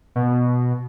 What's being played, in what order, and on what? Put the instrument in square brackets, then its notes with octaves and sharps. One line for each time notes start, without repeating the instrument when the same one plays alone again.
[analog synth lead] B2